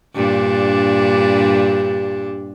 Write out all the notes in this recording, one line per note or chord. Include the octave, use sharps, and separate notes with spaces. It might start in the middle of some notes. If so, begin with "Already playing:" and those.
G2 A#2 D4